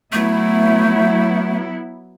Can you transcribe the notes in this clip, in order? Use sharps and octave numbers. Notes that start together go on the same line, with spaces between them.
F#3 A3 B3 E4